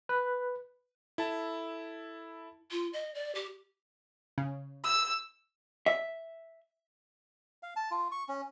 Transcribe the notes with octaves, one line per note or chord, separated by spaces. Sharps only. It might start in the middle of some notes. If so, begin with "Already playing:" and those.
B4
E4 A4 A5
F4
D#5
D5
G4
C#3
E6
E5
F5
A5
F4
C#6
C#4